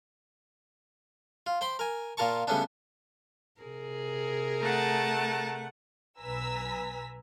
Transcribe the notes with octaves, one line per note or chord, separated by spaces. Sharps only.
F4
C5 G5 B5 C6
A#4 G#5
A#2 F4 A#4 A5 C#6
C#3 G3 A3 B3 C#4 D4
C3 G#4 A#4
A3 F#5 A5 A#5
B1 B4 G#5 A#5 E6 B6